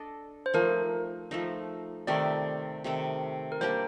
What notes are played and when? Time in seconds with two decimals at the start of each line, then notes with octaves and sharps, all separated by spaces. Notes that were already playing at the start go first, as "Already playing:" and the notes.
Already playing: D4 A4 D#5
0.46 C5
0.54 F3 A3 D#4 A#4
1.31 F3 A3 D#4
2.07 C3 D#3 A3 D5
2.84 C3 D#3 A3
3.52 A#4
3.61 G3 A#3 D4 G4 C5